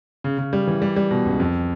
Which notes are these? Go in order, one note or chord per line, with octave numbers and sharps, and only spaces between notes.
C#3
C#3
G3
E3
G3
G3
B2
C#2
F2